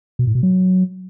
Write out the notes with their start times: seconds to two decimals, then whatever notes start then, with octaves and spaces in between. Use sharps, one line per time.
0.19 B2
0.27 A2
0.35 B2
0.43 F#3